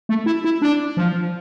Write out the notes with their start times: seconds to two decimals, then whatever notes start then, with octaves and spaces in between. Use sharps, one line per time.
0.09 A3
0.26 E4
0.44 E4
0.62 D4
0.97 F3